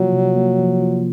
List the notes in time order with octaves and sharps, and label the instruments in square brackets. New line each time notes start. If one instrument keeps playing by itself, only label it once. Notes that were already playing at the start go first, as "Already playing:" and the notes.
Already playing: [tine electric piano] C3 F3 A#3 F4 [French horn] F#3
[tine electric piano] C3
A#3
F3
F4